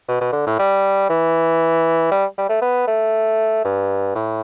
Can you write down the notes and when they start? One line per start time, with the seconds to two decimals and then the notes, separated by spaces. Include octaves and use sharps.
0.08 B2
0.21 B2
0.33 D3
0.47 A2
0.59 G3
1.10 E3
2.11 G3
2.38 G3
2.49 A3
2.62 B3
2.88 A3
3.65 G2
4.15 A2